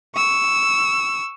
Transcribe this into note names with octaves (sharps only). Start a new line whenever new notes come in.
C#6 E6